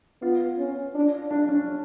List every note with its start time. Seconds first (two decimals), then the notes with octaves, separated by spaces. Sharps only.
0.22 B3 F4
0.58 C#4
0.95 D4
1.31 D4
1.49 C#4